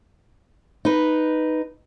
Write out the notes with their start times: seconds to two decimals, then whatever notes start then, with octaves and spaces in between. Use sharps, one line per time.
0.85 D#4 B4